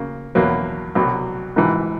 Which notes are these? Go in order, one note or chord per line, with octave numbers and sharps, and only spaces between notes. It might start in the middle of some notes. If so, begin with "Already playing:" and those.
Already playing: C#3 A#3
E2 B2 F#3 A#3
C2 B2 F#3
A#1 G#2 E3